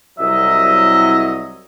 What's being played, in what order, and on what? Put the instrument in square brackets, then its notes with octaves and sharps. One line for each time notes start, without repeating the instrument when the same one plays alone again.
[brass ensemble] C2 F#3 D#5 [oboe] E5